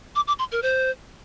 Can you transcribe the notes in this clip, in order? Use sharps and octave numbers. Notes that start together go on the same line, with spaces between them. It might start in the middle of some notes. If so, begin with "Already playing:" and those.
D6
D6
C6
A#4
C5